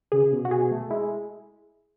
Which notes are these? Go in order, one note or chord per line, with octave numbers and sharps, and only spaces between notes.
C#3 G#4
C#3
B2
F#4
B2 G#4
A3
G#3 E4